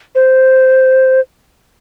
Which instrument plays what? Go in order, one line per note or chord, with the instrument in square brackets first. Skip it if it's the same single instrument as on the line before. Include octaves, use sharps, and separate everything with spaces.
[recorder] C5